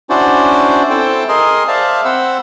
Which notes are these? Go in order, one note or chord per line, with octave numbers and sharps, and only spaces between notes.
C#4 D4 E4 F#4 C5 D5
C4 E4 A4 C5 G5 A5
G#4 A#4 D#5 C6
C5 D5 E5 F5 A5
C4 C5 F#5 B5 E6